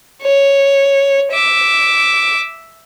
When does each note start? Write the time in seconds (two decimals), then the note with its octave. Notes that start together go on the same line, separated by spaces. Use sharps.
0.22 C#5
1.32 E5 D6